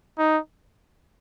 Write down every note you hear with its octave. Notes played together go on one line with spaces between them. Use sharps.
D#4